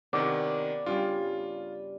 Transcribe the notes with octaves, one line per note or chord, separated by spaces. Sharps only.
C3 D#3 B3 C#4 A#4 D5
G2 C#3 G3 F4